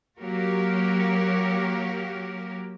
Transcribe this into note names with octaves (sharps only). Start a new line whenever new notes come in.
F#3 A#3 F#4 G4 A#4